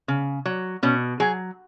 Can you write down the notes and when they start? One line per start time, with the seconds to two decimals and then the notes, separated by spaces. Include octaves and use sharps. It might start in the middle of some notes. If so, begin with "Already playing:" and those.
0.08 C#3
0.46 F#3
0.83 B2 C#4
1.20 F#3 G#4